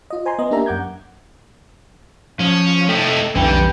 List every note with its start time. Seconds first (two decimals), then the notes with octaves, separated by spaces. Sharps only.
0.10 F4 D#5
0.25 C5 G#5 A#5 C6
0.39 B3 D#5
0.51 A#3 D4 G4 A#4 E5 A#5
0.66 F#2 F#5 D6 G6 G#6
2.39 F3 C#4
2.89 A3 D#4 A4 G5
3.35 B1 F2 D3 E3 G3 B4 G5